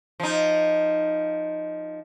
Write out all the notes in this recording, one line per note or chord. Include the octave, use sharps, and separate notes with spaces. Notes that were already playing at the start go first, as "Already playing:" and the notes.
F3 D#4